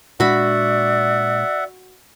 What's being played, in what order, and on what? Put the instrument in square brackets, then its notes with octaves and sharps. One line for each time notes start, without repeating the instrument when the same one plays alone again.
[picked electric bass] A#2 G#3 D4 [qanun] F#4 B5 [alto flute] D5 [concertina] E5 F#5